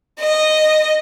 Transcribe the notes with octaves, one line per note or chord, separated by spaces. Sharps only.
D#5